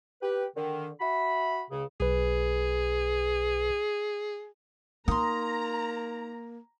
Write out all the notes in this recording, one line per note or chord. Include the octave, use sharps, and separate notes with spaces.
G4 B4
D3 D#3
F#4 E5 B5
C#2 C#3
B1 G#4 B4
A#3 D#4 A#5 C6 D#6